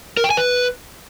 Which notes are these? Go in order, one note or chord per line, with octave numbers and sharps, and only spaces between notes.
A#4
G5
G#5
B4